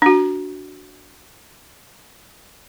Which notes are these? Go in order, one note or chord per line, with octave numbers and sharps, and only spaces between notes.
D4 F#4